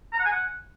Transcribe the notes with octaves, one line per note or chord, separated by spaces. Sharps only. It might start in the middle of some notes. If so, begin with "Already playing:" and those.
A#5
F#5
G#5
F#5